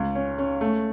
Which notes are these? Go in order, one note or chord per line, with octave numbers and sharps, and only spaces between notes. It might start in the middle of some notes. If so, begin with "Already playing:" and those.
Already playing: C#2
C#4
C#4
A3